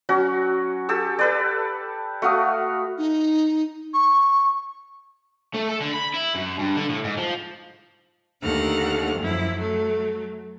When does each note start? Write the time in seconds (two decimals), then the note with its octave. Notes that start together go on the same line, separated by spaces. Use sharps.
0.09 F#3 C#4 F#4
0.89 G4 A4 E6
1.19 A4 B4 D5
2.22 A3 F#4 F5 D#6
2.98 D#4
3.94 C#6
5.54 A3
5.69 A4
5.80 D3
5.93 B5
6.14 E4
6.35 F#2
6.59 G2
6.77 D3
6.89 A2
7.04 G#2
7.17 F3
8.42 D#2 D3 A3 F#5 F6
9.19 F#2 F3 E4
9.56 F#3 A3